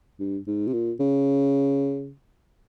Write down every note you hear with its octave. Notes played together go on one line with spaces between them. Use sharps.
G2
G#2
C3
A#2
C#3